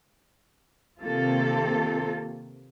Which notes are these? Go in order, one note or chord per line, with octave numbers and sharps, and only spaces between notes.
C3 D#3 A#3 C4 F4 A4